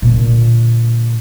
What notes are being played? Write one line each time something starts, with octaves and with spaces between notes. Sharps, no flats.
A#2 D3